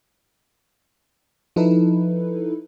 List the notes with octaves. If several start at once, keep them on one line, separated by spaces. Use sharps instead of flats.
F3 D#4 E4 A4 B4